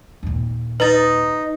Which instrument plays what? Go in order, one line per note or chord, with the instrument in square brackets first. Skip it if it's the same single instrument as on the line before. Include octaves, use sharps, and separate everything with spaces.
[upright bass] D#2 A#2
[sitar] D#4 [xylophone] B4 A6